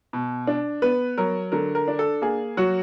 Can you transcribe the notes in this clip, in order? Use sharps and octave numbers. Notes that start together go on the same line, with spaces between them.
B2
D4
B3 B4
F#3 A#4
D3 A#4
A#4
D4
A4
A#3 G#4
F#3 F#4